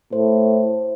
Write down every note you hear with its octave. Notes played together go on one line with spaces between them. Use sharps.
A2 C5